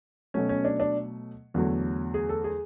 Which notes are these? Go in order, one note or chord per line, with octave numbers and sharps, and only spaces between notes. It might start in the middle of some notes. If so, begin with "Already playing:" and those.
B2 F#3 A3 C#4
C#4
D4
D4
E2 D3 F#3 A3
G#4
A4
G#4